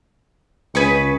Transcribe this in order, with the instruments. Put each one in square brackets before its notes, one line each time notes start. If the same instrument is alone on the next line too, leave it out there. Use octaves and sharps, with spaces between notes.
[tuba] C#2 [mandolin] G#4 B4 C#6